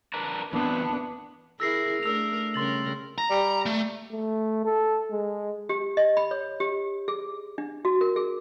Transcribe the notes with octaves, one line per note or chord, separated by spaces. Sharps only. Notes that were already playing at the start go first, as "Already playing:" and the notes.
D4 A#4 B4
E3 B3 C4 D4
E4 G#4 A#4 E6 A#6 C7
A3 D4 A#4 E6 F7
C#3 G3 A#4 C6 A6 F#7
A#5
G3
A3
A3
A4
G#3
G4
D#5
B5
C#5
G4
G#4
D4
F#4
A#4
G#4